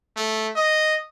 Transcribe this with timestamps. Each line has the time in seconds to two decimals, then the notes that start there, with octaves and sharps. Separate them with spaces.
0.16 A3
0.55 D#5